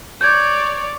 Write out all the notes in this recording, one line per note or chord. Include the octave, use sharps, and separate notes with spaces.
C#5 D5 G6 G#6